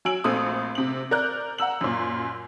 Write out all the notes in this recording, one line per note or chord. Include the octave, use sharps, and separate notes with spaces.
F#3 G#5 E6 D7 F#7
A#1 A3 C4 D#6
C3 F#7
A#4 D5 F#6 G6
F#5 A#5 E6 F#7
F#2 A#2